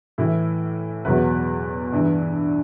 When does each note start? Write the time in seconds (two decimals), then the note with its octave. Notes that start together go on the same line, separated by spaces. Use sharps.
0.18 A2 E3 E4
1.05 E2 B2 F#3 B4
1.92 G2 E3